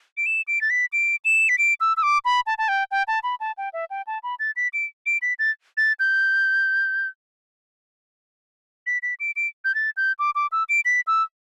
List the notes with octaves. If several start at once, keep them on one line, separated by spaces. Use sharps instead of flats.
D7
E7
D7
A6
B6
D7
E7
B6
D7
E6
E6
D6
B5
A5
A5
G5
G5
A5
B5
A5
G5
E5
G5
A5
B5
A6
B6
D7
D7
B6
A6
A6
G6
B6
B6
D7
D7
G6
A6
G6
D6
D6
E6
D7
B6
E6